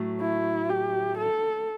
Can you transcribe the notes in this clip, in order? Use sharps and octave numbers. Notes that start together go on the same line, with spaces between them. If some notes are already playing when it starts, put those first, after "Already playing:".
Already playing: A2 F#3 A3
E4
G4
A4